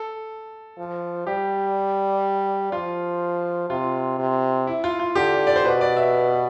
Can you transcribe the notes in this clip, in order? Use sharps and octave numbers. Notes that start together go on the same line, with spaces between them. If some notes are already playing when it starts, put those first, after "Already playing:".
Already playing: A4
F3
G3 G4
F3 F4
C3 F4
C3
E4
F4
F4
D3 G4
D5
C5
B2 B4
D5
E5